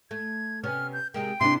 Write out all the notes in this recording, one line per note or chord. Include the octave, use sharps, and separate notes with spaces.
A3 G#6
C3 B3 C#4 F6
G6
C3 G#3 A#3 G5
C3 D4 E4 C6